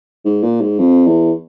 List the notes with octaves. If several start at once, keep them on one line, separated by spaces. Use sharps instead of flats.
G#2
A#2
G#2
F2
E2